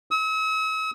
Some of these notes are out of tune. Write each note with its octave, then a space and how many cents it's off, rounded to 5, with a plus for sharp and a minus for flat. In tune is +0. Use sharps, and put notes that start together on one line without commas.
E6 -45